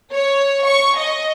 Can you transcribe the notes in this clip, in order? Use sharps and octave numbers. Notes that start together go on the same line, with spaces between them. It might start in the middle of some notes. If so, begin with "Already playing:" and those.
C#5
C#6
D#5